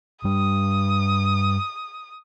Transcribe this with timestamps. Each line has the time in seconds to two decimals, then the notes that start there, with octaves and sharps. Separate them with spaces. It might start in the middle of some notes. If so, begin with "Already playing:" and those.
0.24 G2 G3 D#6